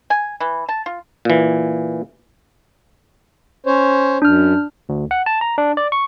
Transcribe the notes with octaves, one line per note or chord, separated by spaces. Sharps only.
G#5
E3
A5
F4
A#2 E3
C#4 C5 C#5
F#2 D4 F6
D2
F#5
A5
A#5
D4
D5
C#6